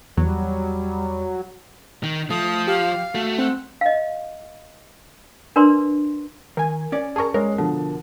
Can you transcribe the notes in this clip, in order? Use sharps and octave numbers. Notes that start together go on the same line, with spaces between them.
E2 F#3 G3
D#3
F3 A3 D#6
G4 F5
A3 F#4
C4 F#5
D#5 F5
D4 A#4 B4 D5 C6
D#3 A#4 G#5
C#4 D5
G#4 A#4 A5 C#6
G#3 A#4 C#5
B2 D3 F3